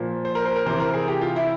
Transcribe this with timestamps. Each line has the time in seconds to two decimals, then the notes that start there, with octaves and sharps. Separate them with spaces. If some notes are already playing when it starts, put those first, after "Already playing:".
Already playing: A#2 F3
0.25 C5
0.35 A#4
0.45 C5
0.56 A#4
0.66 C3 E3 C5
0.80 A#4
0.94 G#4
1.08 G4
1.21 F4
1.36 E4